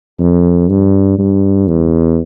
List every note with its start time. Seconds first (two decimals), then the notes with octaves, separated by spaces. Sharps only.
0.19 F2
0.69 G2
1.18 G2
1.67 E2